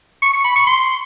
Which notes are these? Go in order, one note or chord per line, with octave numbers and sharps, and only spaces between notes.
C#6
C#6
B5
C#6
C6